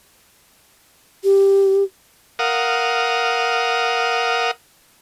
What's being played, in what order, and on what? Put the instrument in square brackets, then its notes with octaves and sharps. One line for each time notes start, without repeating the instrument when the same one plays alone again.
[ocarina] G4
[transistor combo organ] A#4 F5 F#5 D#6